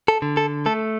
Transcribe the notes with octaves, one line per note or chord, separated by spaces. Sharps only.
A4
D3
A4
A3 A4